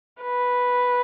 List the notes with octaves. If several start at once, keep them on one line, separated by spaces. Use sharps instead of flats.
B4